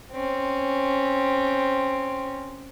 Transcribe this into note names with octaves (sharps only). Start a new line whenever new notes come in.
C4 C#4